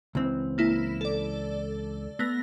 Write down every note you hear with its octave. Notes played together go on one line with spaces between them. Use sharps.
C#2 E3 C4
A#3 E4
A4 D5
A3 B3 A#6